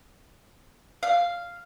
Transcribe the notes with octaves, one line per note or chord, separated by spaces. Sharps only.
F5